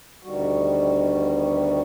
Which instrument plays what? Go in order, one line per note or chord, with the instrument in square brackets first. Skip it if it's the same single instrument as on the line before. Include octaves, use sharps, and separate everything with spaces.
[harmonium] D2 B2 D#3 G3 F#4